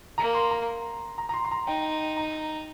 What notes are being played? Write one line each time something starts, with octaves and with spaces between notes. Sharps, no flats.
A#3 A#5
C6
A#5
A#5
A#5
C6
C6
A#5
D#4 G5
A#5